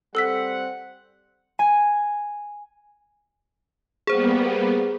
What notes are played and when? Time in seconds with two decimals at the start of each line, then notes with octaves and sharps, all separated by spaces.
0.15 G3 C4 A4 F#5 E6 B6
1.59 G#5
4.07 G3 A#3 B3 G#4 C5